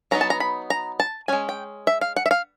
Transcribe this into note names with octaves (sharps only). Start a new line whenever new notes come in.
F#3 B3 D#4 A#5
A5
A#5
B5
A#5
A5
G#3 C#4 G#5
G5
E5
F5
F#5
E5
F5